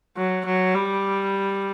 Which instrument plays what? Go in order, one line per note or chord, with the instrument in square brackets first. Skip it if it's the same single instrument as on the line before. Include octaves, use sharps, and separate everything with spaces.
[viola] F#3
F#3
G3